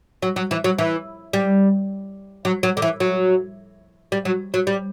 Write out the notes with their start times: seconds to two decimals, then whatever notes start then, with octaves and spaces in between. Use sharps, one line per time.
0.22 F#3
0.36 F#3
0.51 E3
0.64 F#3
0.78 E3
1.33 G3
2.45 F#3
2.63 F#3
2.77 D3
2.82 E3
3.00 F#3
4.12 G3
4.25 F#3
4.54 F#3
4.67 G3